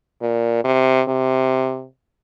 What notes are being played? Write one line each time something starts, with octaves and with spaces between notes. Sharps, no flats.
A#2
C3
C3